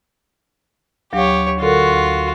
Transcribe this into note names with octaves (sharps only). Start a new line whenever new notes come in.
D2 F#3 G4 C#5 F5
D3 F4 F#4 A4 A#4
D2